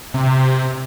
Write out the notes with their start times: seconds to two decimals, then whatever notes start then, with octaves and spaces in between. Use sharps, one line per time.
0.14 C3